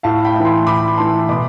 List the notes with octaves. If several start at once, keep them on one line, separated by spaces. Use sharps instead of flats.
A2 F5 A5
G5 B5
E3 A3
A5 C6
A2 B5 D6
E3 A3 A5 C6
B2 B5 D6